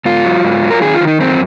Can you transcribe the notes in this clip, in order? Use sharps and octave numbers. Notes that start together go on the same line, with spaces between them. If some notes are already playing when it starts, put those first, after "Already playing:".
G#2 F4
F#3
G#2
F#3
A#4
D#3 G#4
F4
D#3
D#4
F#2 C4